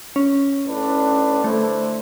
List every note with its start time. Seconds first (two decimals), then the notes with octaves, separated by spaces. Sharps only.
0.16 C#4
0.67 A2 D4 B4
1.44 D3 A3 E4 C5